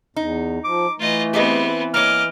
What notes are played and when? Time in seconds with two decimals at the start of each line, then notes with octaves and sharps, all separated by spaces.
0.16 E2 D#4
0.64 F3 D6
1.00 E3 A3 F4 D#5
1.34 B3 C4 G4 G#4 D#5
1.94 A#3 C#5 D#5 D6 F6